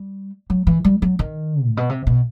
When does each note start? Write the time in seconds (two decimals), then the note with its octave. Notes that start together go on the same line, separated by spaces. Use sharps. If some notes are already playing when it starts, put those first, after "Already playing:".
Already playing: G3
0.50 F#3
0.67 E3
0.84 G3
1.02 F#3
1.19 D#3
1.64 A2
1.77 B2
1.89 C3
2.07 B2